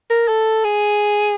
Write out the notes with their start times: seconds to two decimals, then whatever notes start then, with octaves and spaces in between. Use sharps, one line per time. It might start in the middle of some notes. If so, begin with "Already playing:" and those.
0.10 A#4
0.28 A4
0.64 G#4